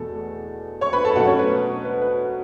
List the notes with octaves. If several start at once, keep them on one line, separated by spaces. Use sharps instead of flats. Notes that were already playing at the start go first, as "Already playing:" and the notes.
Already playing: E2 B2 A3 A4
C#5 C#6
B4 B5
A4 A5
B2 F#3 A3 F#4 F#5
C#4 C#5
B4
B4
B4